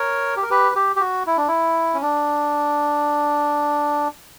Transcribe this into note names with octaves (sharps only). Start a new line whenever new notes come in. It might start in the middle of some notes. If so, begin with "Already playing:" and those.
Already playing: A#4 C#5
G4
A#4
G4 B4
G4
G4
F#4
E4
D4
E4
C#4
D4